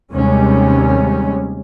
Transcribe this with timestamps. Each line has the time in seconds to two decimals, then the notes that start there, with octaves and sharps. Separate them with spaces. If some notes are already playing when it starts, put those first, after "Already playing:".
0.12 D#2 C3 G3 G#3 C#4